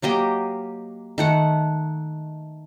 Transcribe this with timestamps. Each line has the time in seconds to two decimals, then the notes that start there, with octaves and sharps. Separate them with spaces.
0.02 F#3 A#3 G4 D#5
1.18 D#3 A3 F#5